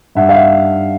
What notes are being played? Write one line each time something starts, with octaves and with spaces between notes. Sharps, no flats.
G2 E5 F#5
F5
E5 F#5